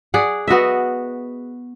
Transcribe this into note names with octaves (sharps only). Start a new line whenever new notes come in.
G#4 D5 F#5
B3 F#4 D#5 E5